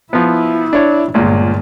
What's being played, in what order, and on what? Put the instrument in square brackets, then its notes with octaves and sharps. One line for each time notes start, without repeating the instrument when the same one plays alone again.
[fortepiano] F3 B3 [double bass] E4
[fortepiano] D4 C#5
[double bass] G1 [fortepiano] C#2 A#2